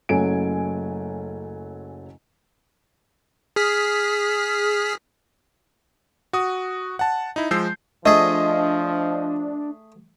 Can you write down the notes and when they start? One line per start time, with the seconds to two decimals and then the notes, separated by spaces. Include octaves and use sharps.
0.09 F#1 F#3 A3 C#4 G#5 D7
3.56 G#4 F6 B6
6.33 F#4 D#6
6.99 F#5 A5
7.36 D#4 E4
7.51 F3 G#3 E6 G6 C7
8.06 F3 A3 D4 G#4 D#5